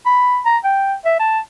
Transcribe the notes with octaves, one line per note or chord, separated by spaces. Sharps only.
B5
A#5
G5
E5
A5